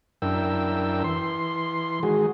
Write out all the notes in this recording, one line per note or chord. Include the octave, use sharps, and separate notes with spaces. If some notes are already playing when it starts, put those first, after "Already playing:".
F#2 D4 E4 A#4 G5 E6
E3 C6
D#3 G#3 F#4 G#4